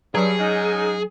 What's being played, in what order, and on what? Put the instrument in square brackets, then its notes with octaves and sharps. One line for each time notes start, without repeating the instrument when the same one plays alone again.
[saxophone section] G2 [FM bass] F#3 [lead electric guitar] G#4
[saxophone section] G#2 C#4 D#4